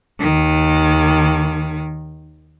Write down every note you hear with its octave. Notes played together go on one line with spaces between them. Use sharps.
D#2 D#3